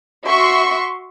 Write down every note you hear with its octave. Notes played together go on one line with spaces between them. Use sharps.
F#4 E5 C6 C#6